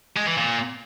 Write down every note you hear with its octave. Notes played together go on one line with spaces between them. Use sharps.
G#3
E3
A#2